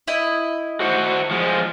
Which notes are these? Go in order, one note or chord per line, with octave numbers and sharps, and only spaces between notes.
E4 D#5
F#4 C5 F#5
F3 G#3